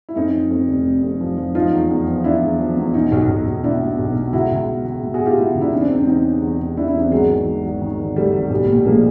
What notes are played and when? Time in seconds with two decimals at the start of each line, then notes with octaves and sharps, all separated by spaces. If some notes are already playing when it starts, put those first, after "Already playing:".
0.09 E4
0.16 F2 C#4 D#4
0.34 F3
0.50 F2
0.68 F1
0.86 C3
1.03 F2
1.21 F3
1.38 F3
1.55 F3 D#4 F4
1.72 E2
1.90 E2
2.07 F3
2.24 F3 D4 E4
2.42 E2
2.59 F3
2.77 E2
2.94 B2 C#4 D#4
3.12 B1
3.29 B1
3.47 B1
3.64 B2 D4 E4
3.81 B2
3.99 B1
4.15 B2
4.33 C#2 E4 F#4
4.51 C#2
4.68 B2
4.85 C#2
5.03 B2
5.14 F#4 G#4
5.20 B2
5.26 F4 G4
5.38 B2 E4 F#4
5.55 C#2
5.61 D4 E4
5.72 E2 C#4 D#4
5.81 C4 D4
5.90 E2
5.98 C4 D4
6.07 E2 C#4 D#4
6.25 C3
6.42 E2
6.60 C3
6.77 E2 D4 E4
6.88 D4 E4
6.94 E2
7.00 C4 D4
7.11 G#1 F#3 G#3
7.29 D#3
7.46 G#1
7.63 G#1
7.82 D#3
7.99 G#1
8.16 G#1 G3 A3
8.33 G#1
8.50 B1
8.68 A#2
8.85 F3 G#3 A#3